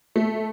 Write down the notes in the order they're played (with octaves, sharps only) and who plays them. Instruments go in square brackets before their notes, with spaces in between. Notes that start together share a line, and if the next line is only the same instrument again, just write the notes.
[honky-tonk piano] A3